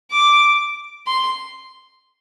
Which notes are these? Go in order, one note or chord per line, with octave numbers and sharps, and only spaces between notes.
D6
C6